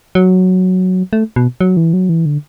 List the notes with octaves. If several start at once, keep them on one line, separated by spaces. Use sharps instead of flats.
F#3
A3
B2
F#3
E3
F#3
E3
D3